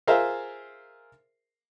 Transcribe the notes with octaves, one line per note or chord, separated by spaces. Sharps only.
F4 G#4 A#4 C5 E5 F5